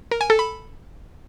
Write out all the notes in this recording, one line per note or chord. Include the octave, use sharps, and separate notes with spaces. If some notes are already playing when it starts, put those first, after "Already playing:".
A#4
G#5
A4
B5